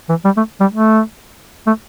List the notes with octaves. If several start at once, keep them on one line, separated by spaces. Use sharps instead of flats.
E3
G3
A3
G3
A3
A3